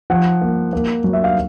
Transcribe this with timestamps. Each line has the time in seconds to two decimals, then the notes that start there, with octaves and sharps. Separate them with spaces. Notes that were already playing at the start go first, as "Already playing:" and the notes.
0.10 F3 F#5
0.41 A#3
0.73 A#3
1.04 F#3
1.13 E5
1.24 F5